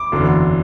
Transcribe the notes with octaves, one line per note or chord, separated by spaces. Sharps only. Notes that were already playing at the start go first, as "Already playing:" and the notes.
Already playing: D6
F#1 E2 D3 F#3